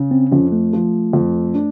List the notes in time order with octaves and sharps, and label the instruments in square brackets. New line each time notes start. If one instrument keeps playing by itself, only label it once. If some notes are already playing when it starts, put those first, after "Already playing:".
Already playing: [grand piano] C#3
[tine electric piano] C4
[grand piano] F2 [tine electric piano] C#4
[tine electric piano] A3
[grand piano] F3
F2
D4